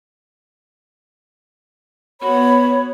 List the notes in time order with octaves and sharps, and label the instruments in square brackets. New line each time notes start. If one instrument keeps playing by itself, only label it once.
[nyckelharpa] B3 F#4 [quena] C#5 [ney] B5